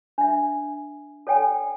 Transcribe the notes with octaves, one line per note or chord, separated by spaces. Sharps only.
D4 E5
A4 C#5 D5 G5 G#5